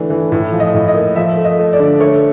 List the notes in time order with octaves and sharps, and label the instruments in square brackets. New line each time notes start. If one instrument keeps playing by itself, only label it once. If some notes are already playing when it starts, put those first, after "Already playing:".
Already playing: [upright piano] D3 E3 A3 D4
E3
A2
F3
D#5
A2
D#5
A#3
F3 E5
A3
D#5
A3
D5
D3
A3 C#5